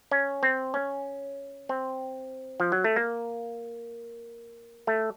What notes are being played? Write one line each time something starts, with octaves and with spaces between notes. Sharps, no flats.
C#4
C4
C#4
C4
F3
F#3
A3
A#3
A3